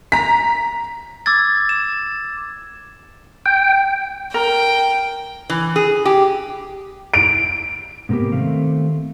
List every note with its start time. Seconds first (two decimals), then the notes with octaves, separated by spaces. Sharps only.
0.12 A#5 B6
1.26 D6 E6 G#6 A6
1.69 E7
3.46 G5
4.34 A#4 G5
5.50 E3
5.76 G#4
6.06 G4
7.14 D7
8.09 G#2 C3 A#3 B3 G4
8.32 D#3 A3 C4 F5